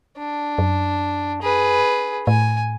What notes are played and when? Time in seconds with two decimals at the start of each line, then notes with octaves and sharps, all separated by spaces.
0.18 D4
0.58 F#2
1.42 G#4 B4
2.27 A2 G#5